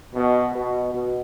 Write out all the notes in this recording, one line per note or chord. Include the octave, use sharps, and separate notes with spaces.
B2
B2
B2